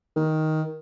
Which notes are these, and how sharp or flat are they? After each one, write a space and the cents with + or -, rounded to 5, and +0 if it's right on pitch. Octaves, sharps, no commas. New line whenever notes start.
D#3 +10